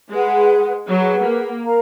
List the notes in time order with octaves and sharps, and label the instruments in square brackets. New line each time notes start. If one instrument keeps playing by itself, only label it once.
[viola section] G#3 [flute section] G#4 B4 F#5
[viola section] F#3 [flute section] G#4 B4 F#5
[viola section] A#3
[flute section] A#4 F5 A#5